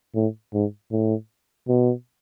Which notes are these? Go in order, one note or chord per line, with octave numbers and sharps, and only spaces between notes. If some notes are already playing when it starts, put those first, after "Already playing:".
A2
G#2
A2
B2